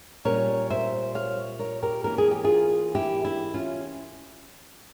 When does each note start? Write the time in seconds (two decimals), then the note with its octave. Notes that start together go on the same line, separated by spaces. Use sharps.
0.25 A#2 G3 C#4 A#4 C#5
0.70 C5 E5
1.15 C#5 F5
1.59 A#4 C#5
1.82 G4 A#4
2.04 E3 A#3 C#4 A#4
2.18 G#4
2.31 G4
2.44 F4 G#4
2.95 E4 G4
3.25 E4
3.54 C#4 F4